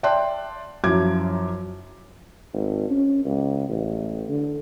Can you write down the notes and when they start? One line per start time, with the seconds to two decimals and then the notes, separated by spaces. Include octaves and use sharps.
0.03 D5 E5 G5 A5 C6 F#6
0.84 F#2 F3 F#3 E4 D6 G#6
2.53 G#1
2.90 C#4
3.25 C#2
3.69 A1
4.29 D3